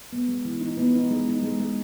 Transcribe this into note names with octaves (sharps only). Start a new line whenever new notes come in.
B3
G#3
E3
D#4
B3
D#4
G#3
D#4
G#3
G#3